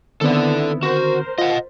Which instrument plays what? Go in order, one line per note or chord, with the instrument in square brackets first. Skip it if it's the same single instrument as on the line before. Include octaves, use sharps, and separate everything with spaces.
[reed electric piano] D3 D#3 C4 [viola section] B3 E4 [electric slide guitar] A4 D5
[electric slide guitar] F#4 [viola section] A#4 C5
[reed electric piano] F4 [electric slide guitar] D#5 F#5